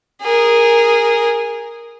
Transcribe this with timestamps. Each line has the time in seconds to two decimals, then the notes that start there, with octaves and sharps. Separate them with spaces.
0.22 G#4 A#4